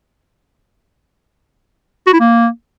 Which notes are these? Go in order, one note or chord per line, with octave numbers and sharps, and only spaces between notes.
F#4
E4
A#3